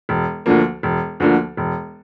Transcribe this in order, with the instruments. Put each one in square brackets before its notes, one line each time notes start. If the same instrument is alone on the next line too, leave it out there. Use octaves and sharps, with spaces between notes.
[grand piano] E1
D2 D3 F3 A#3
E1
D2 D3 F3 A#3
E1